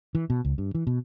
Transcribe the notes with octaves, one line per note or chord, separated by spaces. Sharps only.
E3
B2
C#2
G2
E3
B2